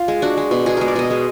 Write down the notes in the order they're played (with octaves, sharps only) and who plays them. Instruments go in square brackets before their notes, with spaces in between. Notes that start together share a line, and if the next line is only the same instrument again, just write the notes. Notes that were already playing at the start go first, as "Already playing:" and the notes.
Already playing: [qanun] F4
G#3
D4 F#4
G#3
B2
B2 G#4
G#3 A#4
D5
B2 D#5
G#3